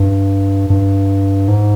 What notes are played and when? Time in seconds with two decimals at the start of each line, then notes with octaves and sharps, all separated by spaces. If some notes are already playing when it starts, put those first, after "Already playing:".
Already playing: G2
0.70 G2
1.48 G#2